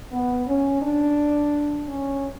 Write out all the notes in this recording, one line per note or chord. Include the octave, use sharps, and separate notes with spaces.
B3
C#4
D4
C#4